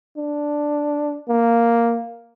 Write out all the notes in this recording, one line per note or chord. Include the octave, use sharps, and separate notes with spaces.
D4
A#3